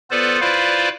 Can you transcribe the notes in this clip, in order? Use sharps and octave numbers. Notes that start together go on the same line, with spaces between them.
B3 F4 A4 B4 C5 D5
E4 F4 B4 C5 D5 F5